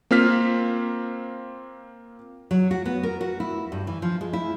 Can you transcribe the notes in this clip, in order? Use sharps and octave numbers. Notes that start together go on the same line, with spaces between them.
A#3 C4 F4 F6 B6
F#3
F#4
B3
A#4
F#4
E4
G2
E3
F3
G#3
E4